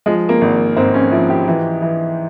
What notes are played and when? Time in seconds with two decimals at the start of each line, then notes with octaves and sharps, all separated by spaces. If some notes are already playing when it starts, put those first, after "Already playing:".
0.06 F3 G#3
0.29 A#3
0.41 G#1
0.77 G#2 C4
0.94 C#4
1.11 F3 E4
1.30 G4
1.48 E3
1.82 E3